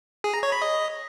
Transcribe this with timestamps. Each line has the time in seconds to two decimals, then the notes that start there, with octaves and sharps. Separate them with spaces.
0.24 G#4
0.34 A#5
0.43 C#5
0.52 B5
0.62 D#5